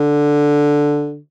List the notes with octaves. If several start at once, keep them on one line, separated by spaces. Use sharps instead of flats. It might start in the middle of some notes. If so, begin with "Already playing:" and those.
Already playing: D3